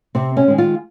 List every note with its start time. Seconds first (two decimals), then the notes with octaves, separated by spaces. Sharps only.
0.15 C3 C4
0.37 C#4
0.48 D#3 G#3
0.58 F4